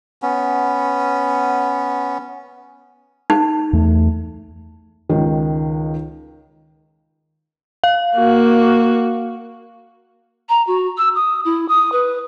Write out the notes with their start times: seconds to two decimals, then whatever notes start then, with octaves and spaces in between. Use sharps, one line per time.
0.22 B3 C#4
3.30 D#4
3.73 E2 A3
5.09 C#2 D#3
7.84 F5
8.18 A#3 F#4
10.49 A#5
10.67 F#4
10.98 E6
11.15 D#6
11.45 E4
11.69 D#6
11.92 B4